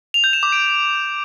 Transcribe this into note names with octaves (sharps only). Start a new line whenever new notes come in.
F7
G6
E7
D6
D7